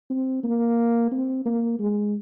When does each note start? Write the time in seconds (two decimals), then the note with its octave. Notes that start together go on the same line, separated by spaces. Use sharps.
0.10 C4
0.44 A#3
1.11 C4
1.45 A#3
1.79 G#3